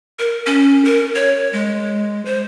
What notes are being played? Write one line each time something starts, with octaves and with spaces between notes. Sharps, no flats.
A#4
C#4
A#4
C#5
G#3
C5